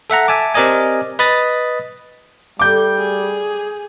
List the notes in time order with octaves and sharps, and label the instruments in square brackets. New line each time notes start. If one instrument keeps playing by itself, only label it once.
[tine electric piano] A4 E5 F#5 A#5
E5 G#5 A5 D6
C4 G4 A#4 D5 D#5 G#5
B4 D#5 B5 D#6 A6
[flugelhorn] G3 [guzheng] A3 [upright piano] D6 G6
[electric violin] G#4